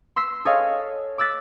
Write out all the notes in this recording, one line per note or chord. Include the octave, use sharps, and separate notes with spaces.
C6 E6 B6 C7
G#4 A4 C#5 D#5 F5
D6 E6 F#6 A6 B6